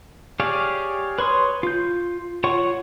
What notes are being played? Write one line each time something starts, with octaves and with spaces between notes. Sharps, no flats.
G4 G#4 C#5 D5 F5
B4 C#5 C6 D#6
F4 G6
F4 C#5 F#5 C#6